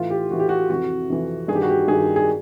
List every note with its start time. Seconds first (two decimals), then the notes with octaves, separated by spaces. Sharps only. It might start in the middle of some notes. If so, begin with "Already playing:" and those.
Already playing: A2 E3 F4
0.10 G4
0.31 A2 E3 F#4
0.40 G4
0.49 F#4
0.69 F2 C3 E3 F#4
1.10 F2 C3 E3
1.48 G2 D#3 G#4
1.55 G4
1.62 F#4
1.70 G4
1.88 G2 D#3 G#4
2.16 G#4